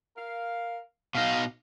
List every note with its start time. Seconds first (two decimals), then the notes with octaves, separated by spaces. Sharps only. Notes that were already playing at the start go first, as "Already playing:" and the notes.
0.17 A#4 F5
1.15 B2 D#4 F5